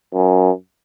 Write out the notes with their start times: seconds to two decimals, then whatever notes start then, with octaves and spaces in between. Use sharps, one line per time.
0.14 F#2